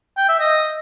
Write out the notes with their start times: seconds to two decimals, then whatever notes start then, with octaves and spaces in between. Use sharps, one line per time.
0.18 G5
0.29 E5
0.40 D#5